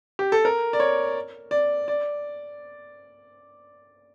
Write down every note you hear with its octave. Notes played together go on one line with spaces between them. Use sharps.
G4
A4
A#4
D5
C#5
D5
D5